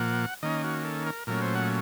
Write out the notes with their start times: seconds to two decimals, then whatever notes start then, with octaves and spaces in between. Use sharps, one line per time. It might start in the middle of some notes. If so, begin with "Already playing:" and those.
Already playing: A#2 F3 A#3 F#5
0.43 D#3 A#3 C#4 D#5
0.64 F#4
0.85 A4
1.07 A#4
1.27 A#2 F#3 A3 C#4 A#4
1.42 C5
1.55 F#5